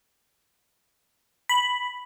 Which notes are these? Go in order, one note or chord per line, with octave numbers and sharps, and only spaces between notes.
B5